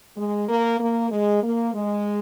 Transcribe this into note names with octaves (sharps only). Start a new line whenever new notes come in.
G#3
A#3
A#3
G#3
A#3
G#3